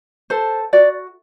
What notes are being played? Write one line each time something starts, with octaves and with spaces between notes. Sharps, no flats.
A4 C5
F#4 D5